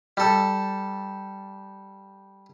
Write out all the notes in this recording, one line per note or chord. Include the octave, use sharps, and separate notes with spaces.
G3 A4